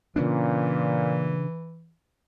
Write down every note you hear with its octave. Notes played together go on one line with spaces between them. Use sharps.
A#2 C#3 E3 C#4 D4